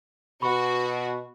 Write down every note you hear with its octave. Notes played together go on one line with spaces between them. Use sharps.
B2 F#4 B5 C#6